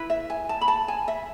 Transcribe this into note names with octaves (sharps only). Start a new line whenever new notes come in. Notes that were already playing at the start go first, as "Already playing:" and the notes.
Already playing: E4 B4
E5
G#5
A5
B5
A5
G#5
E5